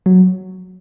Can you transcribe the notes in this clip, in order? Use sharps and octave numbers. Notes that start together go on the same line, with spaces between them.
F#3